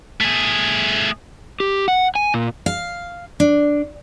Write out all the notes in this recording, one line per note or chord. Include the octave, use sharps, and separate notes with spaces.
A3 G#4
G4
F#5
G#5
A#2
F5
D4